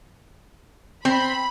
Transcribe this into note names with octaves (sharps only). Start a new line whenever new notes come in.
C4 B5